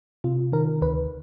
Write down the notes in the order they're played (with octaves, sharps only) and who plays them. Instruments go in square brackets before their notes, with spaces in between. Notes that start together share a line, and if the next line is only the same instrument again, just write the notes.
[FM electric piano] C3 F4
D#3 A#4
D2 B4